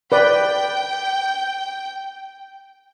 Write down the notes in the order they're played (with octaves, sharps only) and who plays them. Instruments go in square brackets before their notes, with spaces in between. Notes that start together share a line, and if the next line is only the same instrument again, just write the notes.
[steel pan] B4 D5 [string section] G5